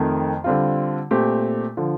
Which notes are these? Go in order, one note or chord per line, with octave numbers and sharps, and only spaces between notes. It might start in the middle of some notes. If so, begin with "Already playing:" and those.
Already playing: F2 D#3 A3
D3 G3 C4 F4
A#2 A3 C4 G4
D3 F3